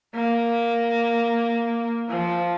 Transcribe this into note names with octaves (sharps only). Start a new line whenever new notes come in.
A#3
F3